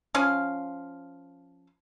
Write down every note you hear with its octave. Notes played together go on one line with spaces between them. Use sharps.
F3 C#4 F5